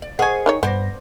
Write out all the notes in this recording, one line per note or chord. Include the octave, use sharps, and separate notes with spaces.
D5
G#4 A#4 C5 D#5 F#5 G#5 C#6
D#3 D#4 C#5
G2 B3 C5 D5 B5 A#6